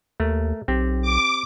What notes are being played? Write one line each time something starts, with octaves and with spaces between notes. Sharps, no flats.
D#2 A3 A#4
B1 C4 G4
D6